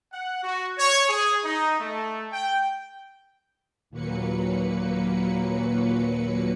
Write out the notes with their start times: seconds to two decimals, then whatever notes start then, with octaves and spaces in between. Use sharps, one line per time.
0.13 F#5
0.43 F#4
0.78 C#5
1.09 G#4
1.45 D#4
1.80 A3
2.32 G5
3.90 D#2 A#2 F#3 A#3 B4 C#7